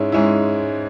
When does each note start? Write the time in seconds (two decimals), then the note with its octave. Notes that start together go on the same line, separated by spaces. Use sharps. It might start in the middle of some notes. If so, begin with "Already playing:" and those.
Already playing: G#2 G#3 C#4 E4
0.12 G#2 G#3 C#4 E4